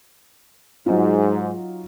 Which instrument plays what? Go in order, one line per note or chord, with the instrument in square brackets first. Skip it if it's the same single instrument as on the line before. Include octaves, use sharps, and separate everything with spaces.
[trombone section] G#2 [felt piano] F#3 D#4 F4